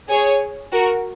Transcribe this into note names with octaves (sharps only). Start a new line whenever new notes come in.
G#4 C#5
F#4 A#4